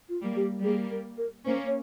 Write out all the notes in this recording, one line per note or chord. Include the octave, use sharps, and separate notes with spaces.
F4
G3 A#3
G4
G3 A#3 G#4
A#4
A#4
A#3 C#4 C5
C#5